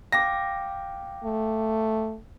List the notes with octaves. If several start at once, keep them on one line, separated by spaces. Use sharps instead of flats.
F5 G5 D6 A#6
A3